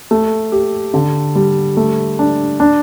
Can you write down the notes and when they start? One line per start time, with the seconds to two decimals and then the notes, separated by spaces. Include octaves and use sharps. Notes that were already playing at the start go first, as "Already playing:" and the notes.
0.11 A3
0.52 G4
0.94 D3
1.35 G3
1.77 A3
2.19 D4
2.60 D4